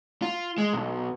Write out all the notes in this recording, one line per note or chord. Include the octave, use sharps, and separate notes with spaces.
F4
G#3
B1